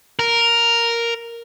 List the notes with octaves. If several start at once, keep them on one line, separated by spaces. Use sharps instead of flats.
A#4